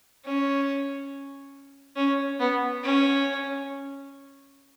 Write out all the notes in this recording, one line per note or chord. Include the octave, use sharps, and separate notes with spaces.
C#4
C#4
B3
C#4